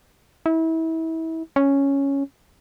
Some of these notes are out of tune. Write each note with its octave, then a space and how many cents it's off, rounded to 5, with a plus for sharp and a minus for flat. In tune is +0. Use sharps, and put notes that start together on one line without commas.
E4 -30
C#4 +0